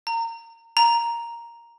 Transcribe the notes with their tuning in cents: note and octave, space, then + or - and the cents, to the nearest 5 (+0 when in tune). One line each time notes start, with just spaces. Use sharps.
A#5 -25
A#5 +5